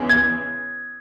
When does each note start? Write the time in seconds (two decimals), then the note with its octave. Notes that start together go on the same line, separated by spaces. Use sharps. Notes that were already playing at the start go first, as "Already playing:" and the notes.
Already playing: E2 C#3 E3 G#3
0.09 G#6